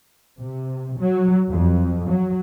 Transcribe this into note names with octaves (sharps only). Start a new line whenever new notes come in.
C3
F#3
F2
F#3